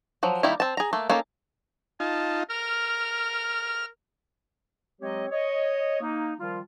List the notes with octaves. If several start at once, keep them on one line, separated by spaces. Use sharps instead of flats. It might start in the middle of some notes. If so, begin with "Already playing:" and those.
F3 F#3
D#3 G3 A#3 E4
C4 A5
G#4 A#5
A3 A#3
A#3 C#4 D#4 A4
D#4 F4 A5
A#4 F6
F#3 G#3 C4 G4 C#5 D#5
C#5 D#5
A#3 D#4
D#3 F3 G3 F4